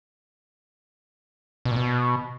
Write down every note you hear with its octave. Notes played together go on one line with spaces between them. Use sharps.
B2
A#2
B2